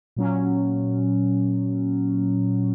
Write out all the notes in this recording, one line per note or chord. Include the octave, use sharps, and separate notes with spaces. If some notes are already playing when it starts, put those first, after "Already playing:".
A#2 F#3 C#4